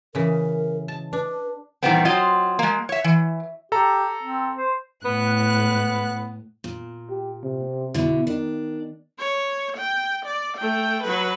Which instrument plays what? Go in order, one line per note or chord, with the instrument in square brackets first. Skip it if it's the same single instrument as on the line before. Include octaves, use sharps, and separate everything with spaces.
[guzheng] C#3 E3 [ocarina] A#4
[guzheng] A5
[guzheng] D4 [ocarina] B4
[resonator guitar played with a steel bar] A#2 D#3 E3 G3 B3 C4
F#3 C4 F4 D#5
G#3 A#3
C#5 E5
E3
[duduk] G4 [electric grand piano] A4 A#5
[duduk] C4
C5
[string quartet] A2 F#6 [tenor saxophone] B3
[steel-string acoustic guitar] A#2
[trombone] G4
C3
[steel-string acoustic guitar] B2 D3 [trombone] E4
[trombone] D#3 [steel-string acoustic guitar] D4
[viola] C#5
G5
D5
A3 G5
F#3 B4